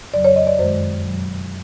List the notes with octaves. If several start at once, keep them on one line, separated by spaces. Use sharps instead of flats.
F2 C#3 F#3 D5
C#5
D#5
D5
F#2 D#3 G#3 C5
B2 F#3